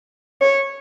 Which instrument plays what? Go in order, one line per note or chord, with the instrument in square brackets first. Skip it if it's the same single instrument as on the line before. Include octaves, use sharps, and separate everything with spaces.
[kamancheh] C#5